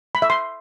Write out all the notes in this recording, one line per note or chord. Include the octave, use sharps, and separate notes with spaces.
B5
E5
C6